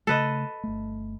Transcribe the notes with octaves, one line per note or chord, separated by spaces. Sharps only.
C#3 A3 A4 B4 D#5
G1 A3